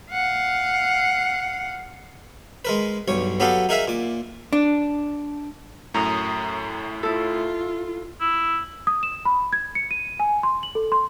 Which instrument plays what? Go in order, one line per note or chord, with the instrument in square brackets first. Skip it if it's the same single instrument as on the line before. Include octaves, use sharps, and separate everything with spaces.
[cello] F5 F#5
[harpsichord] G#3 A#4 B4
B1 G2 C#5
F#3 B3 G4 A4 F5
D#4 G#4 A#4 E5 F5
A#2 D6
[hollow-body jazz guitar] D4
[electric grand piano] F#2 A2 [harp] A#5 D#6
[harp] E4 A4 [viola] F4
[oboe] E4
[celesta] D#6
E7
B5
G#6
C#7
D#7
G#5
C6
F#7
A4
C6